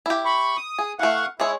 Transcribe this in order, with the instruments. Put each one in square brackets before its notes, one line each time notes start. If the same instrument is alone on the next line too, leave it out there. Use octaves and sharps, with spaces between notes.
[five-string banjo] E4 G4
[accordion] B5 C#6
D#6
[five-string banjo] G#4
[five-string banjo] E3 A3 [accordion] F5 F#5 C#6
[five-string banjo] G#3 G#4 C#5 [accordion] E4